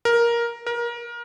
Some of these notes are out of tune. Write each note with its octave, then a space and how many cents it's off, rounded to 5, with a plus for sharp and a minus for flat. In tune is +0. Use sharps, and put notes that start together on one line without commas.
A#4 +10
A#4 +25